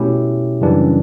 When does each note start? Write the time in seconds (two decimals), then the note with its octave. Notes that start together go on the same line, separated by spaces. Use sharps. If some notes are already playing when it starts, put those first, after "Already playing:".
Already playing: B2 A3 C#4 E4 G4
0.61 F#2 C#3 E3 G3 D4